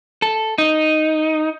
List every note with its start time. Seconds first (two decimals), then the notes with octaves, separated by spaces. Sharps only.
0.22 A4
0.58 D#4